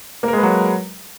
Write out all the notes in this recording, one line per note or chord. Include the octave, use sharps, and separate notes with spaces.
F#3 G#3 A#3 A#4 B4